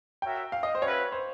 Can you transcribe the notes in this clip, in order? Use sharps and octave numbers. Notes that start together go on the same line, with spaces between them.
F#4 A#4 C#5 E5 G5
F5
D#5
C5
C#4 F#4 B4 C#5 E5
C5